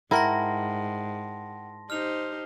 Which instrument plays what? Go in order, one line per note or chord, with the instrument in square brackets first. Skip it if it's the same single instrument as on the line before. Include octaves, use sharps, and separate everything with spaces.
[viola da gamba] G#2 [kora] E4 A#4 [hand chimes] F#5 G5 [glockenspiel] A5 C6 A#6
[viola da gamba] D#4 G4 C5 [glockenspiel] F6 F7